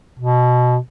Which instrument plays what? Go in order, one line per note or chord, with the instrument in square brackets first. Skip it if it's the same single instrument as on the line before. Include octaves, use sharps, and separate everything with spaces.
[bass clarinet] B2